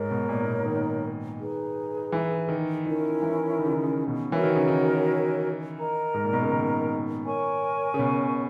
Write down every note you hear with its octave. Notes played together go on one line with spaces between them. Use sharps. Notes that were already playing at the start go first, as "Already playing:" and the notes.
Already playing: G#2 D#4 A#4 C#5
B2
A#2
B2
D#3
D#4 G#4 B4
E3
D#3
D#3 C#4 E4 A#4
E3
D#3
C#3
D#3
C#3
B2
E3 F#4 A#4 C#5
D#3
C#3
D#3
A#4 D#5 A#5
G#2
A#2
B2
C#3
D#3
A#4 C#5 G#5 C#6
C#3
B2